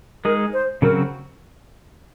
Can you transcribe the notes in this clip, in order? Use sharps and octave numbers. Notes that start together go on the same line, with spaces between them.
G#3 D#4 G#4 A#4
C5
C#3 F#3 C4 F#4 A#4